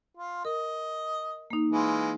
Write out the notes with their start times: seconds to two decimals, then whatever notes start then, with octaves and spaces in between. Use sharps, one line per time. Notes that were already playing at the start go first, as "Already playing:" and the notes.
0.17 F4
0.45 A#4 D#5
1.50 A#3 D#4
1.72 E3 G#3 F4